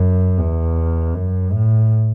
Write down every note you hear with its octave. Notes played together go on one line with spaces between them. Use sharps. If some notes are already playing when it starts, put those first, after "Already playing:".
Already playing: F#2
E2
F#2
A2